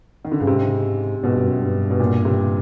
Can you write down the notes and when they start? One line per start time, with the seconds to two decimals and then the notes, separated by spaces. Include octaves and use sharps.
0.25 D#3
0.32 D3
0.40 G2 C#3
0.47 G#2 C3
1.23 G#2 B2
1.35 G2
1.47 F#2
1.58 G2
1.90 B2
2.00 A#2
2.25 C3